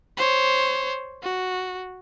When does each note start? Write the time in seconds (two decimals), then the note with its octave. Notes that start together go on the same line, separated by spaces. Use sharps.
0.17 C5 C#5
1.22 F#4